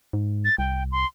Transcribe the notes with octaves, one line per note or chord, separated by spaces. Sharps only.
G#2
A6
C2 G5
C6